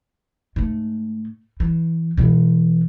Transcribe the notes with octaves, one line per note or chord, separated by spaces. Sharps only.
G#2 A3
E3
B2 E3